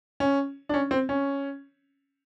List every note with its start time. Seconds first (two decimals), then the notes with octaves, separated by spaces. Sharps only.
0.20 C#4
0.69 D4
0.74 C#4
0.91 C4
1.09 C#4